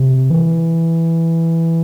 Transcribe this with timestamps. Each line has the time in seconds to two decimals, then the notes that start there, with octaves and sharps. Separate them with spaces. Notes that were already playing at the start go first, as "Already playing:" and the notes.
Already playing: C3
0.30 E3